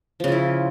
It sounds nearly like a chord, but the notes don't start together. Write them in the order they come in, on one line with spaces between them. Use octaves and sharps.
F3 C#3 F4 E4